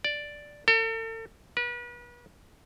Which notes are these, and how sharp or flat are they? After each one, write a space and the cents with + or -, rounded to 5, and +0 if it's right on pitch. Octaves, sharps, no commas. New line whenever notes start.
D5 +0
A4 +40
B4 -35